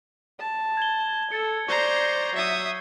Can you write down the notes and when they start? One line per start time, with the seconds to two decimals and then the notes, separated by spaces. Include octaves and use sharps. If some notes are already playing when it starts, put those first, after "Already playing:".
0.40 A5
0.77 G#6 G7
1.32 A4 A6 C#7
1.68 C5 D5 A#5 C#6 G6 C7
2.35 F#3 E5 D#6